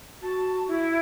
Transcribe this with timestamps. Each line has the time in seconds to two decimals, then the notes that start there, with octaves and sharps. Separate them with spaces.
0.22 F#4 A5
0.67 E4